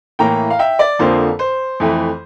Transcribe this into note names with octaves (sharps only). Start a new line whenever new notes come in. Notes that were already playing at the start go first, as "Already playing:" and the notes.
A2 E3 A#3 G5 A#5
F5
E5 G5
D5
F2 D3 F3 A#3 C5
C5
F2 E3 A3